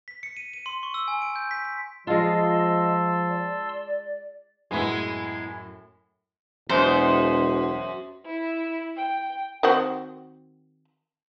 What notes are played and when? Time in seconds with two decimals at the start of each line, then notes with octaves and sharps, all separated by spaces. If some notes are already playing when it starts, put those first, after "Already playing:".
0.08 B6
0.23 C#7
0.37 D#7
0.54 D#7
0.66 C6
0.83 C#6
0.94 E6
1.08 G#5
1.22 D7
1.36 G6
1.51 B6
1.65 B6
2.07 F3 G#3 F4 D#5 A5 C6 E6
3.29 D5
4.71 F#2 A2 G#3 B3 E4
6.69 E1 F#2 C5
8.26 E4
8.96 G5
9.63 D#3 C4 F#4